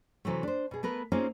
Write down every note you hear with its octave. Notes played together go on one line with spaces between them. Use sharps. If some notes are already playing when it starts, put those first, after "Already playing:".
C3 E3 F#3 A3
D4 C5
B2 G#4
A3 B3 A#4 B4
A#3 C4 C#4 D#4 F4 G#4